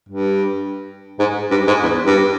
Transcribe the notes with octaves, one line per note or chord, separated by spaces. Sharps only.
G2
G#2
G2
G#2
E2
G2